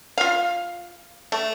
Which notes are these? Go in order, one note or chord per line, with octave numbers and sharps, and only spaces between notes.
F4 F5
A3